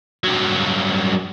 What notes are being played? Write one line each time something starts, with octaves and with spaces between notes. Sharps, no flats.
G2 F#3